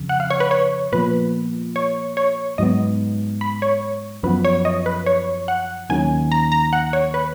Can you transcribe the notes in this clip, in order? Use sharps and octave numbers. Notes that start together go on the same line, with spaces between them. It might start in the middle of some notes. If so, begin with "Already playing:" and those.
Already playing: F2 C#3
F#5
F5
C#5
B4
C#5
A#2 F3 B3 B4
C#5
C#5
G#2 F#3 B3 D#5
B5
C#5
F#2 F3 B3 B4
C#5
D#5
B4
C#5
F#5
D#2 D#3 F#3 C#4 G#5
A#5
A#5
F#5
C#5
B4